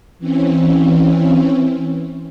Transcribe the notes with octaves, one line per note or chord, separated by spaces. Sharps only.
E3 C4 C#4